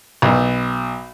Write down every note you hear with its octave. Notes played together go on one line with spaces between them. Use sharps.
B1